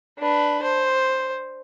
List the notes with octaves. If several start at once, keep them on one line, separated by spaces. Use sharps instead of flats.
D4 B4
C5